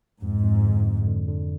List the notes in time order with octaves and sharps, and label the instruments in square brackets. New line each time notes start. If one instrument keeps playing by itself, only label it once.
[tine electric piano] F2 [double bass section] G#2
[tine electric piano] F2
D3
F2
D3
D3